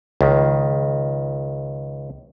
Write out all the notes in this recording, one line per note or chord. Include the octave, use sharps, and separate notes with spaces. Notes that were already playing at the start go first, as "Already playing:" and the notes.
C#2 D#3